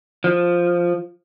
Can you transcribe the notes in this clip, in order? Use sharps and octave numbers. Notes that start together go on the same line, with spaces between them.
F3